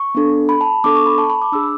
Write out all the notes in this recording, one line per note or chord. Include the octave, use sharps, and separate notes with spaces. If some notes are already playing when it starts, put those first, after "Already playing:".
Already playing: C#6
B3 D4 A4
B5
A5
B3 D4 A4 D6
C#6
B5
A5
B5
D6
D4 G#4 E6